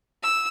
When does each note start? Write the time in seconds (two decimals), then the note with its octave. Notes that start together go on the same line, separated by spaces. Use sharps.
0.23 E6